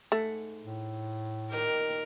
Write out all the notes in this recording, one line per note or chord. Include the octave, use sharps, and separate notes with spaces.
G#2 A3 F#5
A2
A#2 D#3 G4 A#4